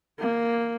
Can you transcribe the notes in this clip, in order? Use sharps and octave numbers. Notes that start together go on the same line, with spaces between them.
A#3